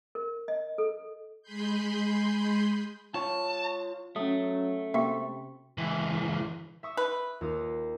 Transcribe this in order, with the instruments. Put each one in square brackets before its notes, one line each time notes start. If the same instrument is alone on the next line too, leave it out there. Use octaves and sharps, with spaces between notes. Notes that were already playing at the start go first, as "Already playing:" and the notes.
[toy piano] A#4
D#5
A4
[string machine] G#3 G#4 B5 C6 G6
[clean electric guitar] F4 C#5 [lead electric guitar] A5
[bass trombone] F#3 [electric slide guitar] A3 [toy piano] C#4 D#6
[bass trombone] C3 [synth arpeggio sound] A#3 E5 [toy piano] F#4 G4 G5
[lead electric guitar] C#2 E3
[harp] E5 C#6 D#6
[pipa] B4
[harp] D#2 F4 D#6